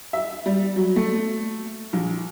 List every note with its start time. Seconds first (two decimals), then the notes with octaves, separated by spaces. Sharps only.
0.13 E5
0.46 G3
0.76 F#3
0.96 A3
1.93 A#1